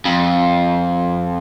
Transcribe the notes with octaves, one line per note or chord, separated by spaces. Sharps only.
F2